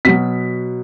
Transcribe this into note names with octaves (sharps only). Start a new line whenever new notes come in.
B2 F#3 B6